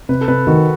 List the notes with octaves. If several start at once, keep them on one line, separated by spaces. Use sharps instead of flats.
C3 B4
A4
C3 B4
D#3 F#4